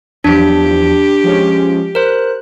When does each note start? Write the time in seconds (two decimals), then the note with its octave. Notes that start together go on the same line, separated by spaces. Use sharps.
0.24 E2 F3 F#3 D4 G4
1.24 F3 G#3 C#4
1.95 A#4 C5 F#6